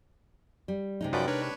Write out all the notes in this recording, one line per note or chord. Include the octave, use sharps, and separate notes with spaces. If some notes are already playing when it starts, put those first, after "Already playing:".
G3
C3 G#3 D#4
F#2 F3 F#4 B4 D5 G5
D4 A#4 B4 C#5